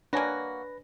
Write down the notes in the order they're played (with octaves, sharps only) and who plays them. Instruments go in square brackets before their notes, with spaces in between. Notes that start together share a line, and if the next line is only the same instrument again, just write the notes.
[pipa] A#3 F#4 [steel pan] D4 C#5 G#5 [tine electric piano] B4 A#6